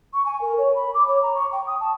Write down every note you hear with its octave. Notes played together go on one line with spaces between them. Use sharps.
C#6
G#5
A#4
C#5
B5
D6
C#5
A#5
C#6
G5
D#6
A5